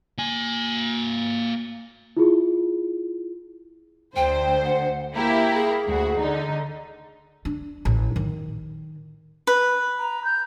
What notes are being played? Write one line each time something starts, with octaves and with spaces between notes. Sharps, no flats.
A#3 G#5
E4 F4 G#4
D2 C5 G5
F#5
A#3 E4 G4 A#5
G#4
D2 F#4
D3 D#4
D4
A1
D#3
B4
A#5
G6